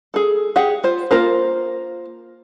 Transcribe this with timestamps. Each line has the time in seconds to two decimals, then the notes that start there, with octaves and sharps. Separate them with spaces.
0.14 G#4 A4
0.56 G4 G#4 F#5
0.84 F4 C5
1.11 A#3 F4 A#4 C5